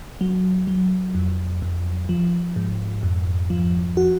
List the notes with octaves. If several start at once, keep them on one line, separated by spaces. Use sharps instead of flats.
F#3
F#3
F2
F2
F3
G#2
F2
F3
F#4